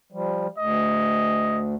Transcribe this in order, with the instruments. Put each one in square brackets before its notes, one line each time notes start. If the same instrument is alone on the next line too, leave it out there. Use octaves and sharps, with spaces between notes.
[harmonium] F3 G3
[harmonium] D2 [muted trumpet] D#5